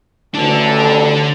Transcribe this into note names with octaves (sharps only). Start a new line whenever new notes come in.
A1 D2 D3 D4 A4